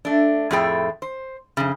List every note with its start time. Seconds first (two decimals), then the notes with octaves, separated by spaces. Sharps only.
0.05 A3 D4
0.51 F2 A2 A3 G#4 A4 G5
1.02 C5
1.57 F2 C#3